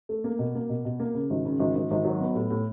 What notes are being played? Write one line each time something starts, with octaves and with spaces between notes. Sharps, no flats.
A3
A#3
B2
A#3
B2
B2
A#3
C#3
G#1
C#3
G#1
G#1
G#1
F#3
B3
A2
A2